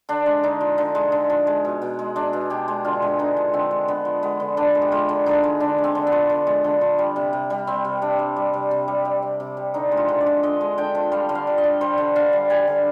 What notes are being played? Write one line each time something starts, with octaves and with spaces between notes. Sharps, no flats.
D3 D4
G#3
D3 D#4
F3
D3
G#3
D3
F3
G#3
B2
B2
G#3
G#3 D4
B2
B2 G4
G#3
D3 F4
G#3
D3 D#4
F3
D3 C4
G#3
D3 B3
F3
G#3 B3
D3
D3 D4
G#3
G4
G#3 F4
D3
D3 D#4
G#3
D3 D4
G#3
C4
D3
B3
F3
D3
G#3
D3
F3
G3
C3
C3
G3
G3 C4
C3
C3 D4
G3
G3
C3
C3
G3
G3
C3
C3
G3
D3 D#4
G#3
F4
D3
D5
F3
D3 D#5
G#3
D3 G5
F3
G3 F5
D3
F5
D3
D#5
G3
G3 C5
D3
D3 F5
G3
G3 G#5
D3